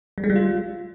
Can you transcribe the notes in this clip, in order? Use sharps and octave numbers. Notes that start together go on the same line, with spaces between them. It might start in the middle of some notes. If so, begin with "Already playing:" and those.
G3
G#3
G3
F4